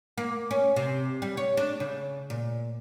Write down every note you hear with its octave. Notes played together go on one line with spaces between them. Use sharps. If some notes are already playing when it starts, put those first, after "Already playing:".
A#3
C#4
C3
G3
C#5
D4
C#3
A#2